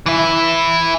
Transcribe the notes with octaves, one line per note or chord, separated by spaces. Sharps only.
E3 E4